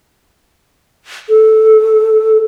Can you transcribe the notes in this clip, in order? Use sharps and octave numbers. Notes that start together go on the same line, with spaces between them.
A4